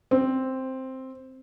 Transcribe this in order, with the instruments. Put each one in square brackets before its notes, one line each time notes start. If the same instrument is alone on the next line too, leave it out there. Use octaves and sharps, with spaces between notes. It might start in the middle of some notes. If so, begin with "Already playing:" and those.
[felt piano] C4